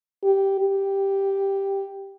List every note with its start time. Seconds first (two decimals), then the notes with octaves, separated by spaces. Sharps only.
0.24 G4
0.60 G4